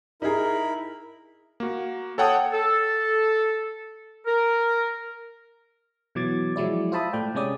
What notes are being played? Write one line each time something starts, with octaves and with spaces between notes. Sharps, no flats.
D#4 E4 G#4 A#4 B5
A#3 F#4
A4 C#5 F#5 G5 A5 D#6
A4
A#4
B2 E3 F#3 D6 G#6 A6
F3 F#3 G#3 E4 D5
F4 C5 E5 A5 B5 D#6
A2 A3 D5 G5
C3 G#3 C#4 D5 D#6